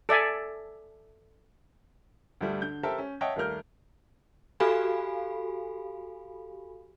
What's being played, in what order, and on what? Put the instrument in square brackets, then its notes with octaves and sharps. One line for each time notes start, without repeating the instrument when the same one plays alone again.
[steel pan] A4 D5 E5 G#5
[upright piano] D2 G2 G3 A3
D3 G6
G4 A4 A#4 C5 E5 A5
C#4
C#5 D#5 E5 F#5 G5 A5
D#2 G3 A3 A#4 F6 G6
[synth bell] F#4 G4 A4 F5 G#5 B5